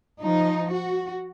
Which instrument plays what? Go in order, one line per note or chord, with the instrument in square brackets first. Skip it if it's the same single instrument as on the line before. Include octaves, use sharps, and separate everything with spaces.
[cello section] F3 D#4
F#4